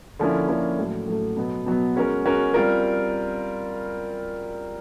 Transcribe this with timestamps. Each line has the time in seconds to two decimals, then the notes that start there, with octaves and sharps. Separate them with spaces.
0.19 D3 F3 A#3 C#4 E4
0.49 D3 F3 A#3 C#4 E4
0.79 A2 F#3 A3
1.08 A2 F#3 A3
1.37 B2 F#3 B3
1.66 B2 F#3 B3
1.96 G#3 C#4 F#4 A#4
2.25 G#3 C#4 F#4 A#4
2.54 G3 C4 F4 A#4